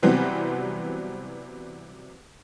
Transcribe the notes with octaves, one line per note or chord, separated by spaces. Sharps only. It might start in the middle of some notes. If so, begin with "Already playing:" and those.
C3 E3 F#3 G3 B3 C4